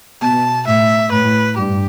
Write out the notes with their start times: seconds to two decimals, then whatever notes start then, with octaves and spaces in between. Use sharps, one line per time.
0.22 B2 A5
0.67 A2 E5
1.11 A2 B4
1.57 G2 G4